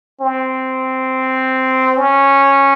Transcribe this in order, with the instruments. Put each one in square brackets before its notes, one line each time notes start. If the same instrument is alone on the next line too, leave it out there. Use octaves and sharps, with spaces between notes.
[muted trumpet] C4
C#4